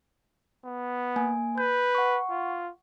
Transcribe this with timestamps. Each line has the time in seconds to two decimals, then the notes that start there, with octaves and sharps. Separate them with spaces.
0.65 B3
1.16 A#3 G#5
1.58 B4 G6
1.95 F#5 C#6
2.30 F4